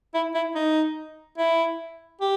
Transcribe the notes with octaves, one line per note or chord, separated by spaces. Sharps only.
E4
E4
D#4
E4
G4